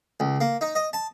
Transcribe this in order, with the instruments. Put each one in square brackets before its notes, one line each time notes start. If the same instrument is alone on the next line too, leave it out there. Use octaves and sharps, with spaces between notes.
[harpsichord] C#2
A#3
D#4
D#5
A5